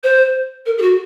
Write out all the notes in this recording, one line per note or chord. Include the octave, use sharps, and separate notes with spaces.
C5
A#4
G#4
F#4